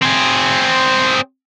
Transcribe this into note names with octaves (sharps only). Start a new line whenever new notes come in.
C4 G#4